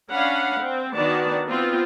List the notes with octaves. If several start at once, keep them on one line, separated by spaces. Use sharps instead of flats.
C#4 D4 F5 F#5 B5
C4
D#3 B3 D4 F#4 D5 A5
B3 C4 F4